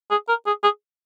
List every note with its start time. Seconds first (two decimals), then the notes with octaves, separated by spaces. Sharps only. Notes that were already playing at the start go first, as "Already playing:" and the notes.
0.11 G#4
0.29 A#4
0.46 G#4
0.63 G#4